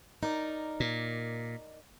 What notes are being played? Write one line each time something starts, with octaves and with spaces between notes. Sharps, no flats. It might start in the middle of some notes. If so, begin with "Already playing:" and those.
D#4 A#4 D5
A#2